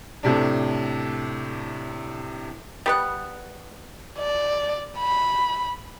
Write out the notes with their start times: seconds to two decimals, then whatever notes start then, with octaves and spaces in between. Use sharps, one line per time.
0.23 A2 C3 D4
2.86 G3 B3 F#5
4.19 D5
4.99 B5